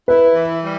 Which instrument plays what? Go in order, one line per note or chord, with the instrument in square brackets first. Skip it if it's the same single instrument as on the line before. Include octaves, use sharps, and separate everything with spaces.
[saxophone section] E4 [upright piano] B4
[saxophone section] E3
G3